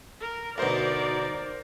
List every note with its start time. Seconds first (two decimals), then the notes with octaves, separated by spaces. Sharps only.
0.21 A#4
0.58 D2 B2 D#4 A#4 C5 D5